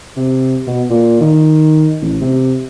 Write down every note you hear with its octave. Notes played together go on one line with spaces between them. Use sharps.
C3
B2
A#2
D#3
A1
C3